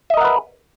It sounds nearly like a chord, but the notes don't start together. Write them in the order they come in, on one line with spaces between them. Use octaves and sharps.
E5 D#5 A#4 F#5 B4